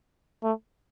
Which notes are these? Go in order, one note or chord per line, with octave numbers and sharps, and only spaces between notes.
A3